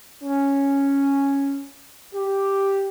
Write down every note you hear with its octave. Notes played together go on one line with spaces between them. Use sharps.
C#4
G4